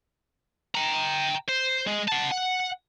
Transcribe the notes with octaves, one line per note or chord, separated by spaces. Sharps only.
G5 A#5
C5
G#3
F#5 A5
F#5